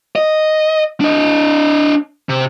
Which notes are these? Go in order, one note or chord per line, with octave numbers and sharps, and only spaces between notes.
D#5
D4 D#5
C3